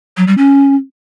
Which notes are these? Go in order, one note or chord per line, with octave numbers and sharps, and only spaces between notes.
F#3
G3
C#4